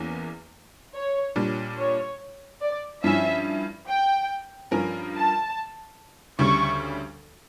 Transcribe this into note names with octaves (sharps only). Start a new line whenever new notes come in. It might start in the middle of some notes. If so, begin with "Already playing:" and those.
Already playing: E2 E3 A#3 C#4
C#5
A#2 G3 D4
C#5
D5
G2 F3 C#4 E4 E5
G5
G2 F3 C#4 F4 A#4
A5
D2 C#3 G3 C#6